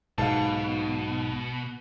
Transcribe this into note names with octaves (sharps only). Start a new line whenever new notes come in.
B1 G#2 B2 F5 A5